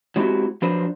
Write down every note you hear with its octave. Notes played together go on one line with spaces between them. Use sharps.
F#3 G#3 C4 E4 F#4 G4
F3 F#3 D4 B4 C5